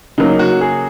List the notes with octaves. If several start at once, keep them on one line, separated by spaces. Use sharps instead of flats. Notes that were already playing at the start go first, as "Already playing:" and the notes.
C#3 F#3 A#3 D#4
F#4
G#4